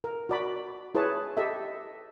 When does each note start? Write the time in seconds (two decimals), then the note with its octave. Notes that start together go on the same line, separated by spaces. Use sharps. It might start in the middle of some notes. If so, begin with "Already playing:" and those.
0.04 A#4
0.29 F#4 D5 B5
0.95 E4 G#4 B4 C#5 A5
1.37 G4 A4 D#5 E5